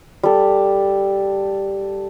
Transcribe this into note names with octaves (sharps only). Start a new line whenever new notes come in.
G3 A4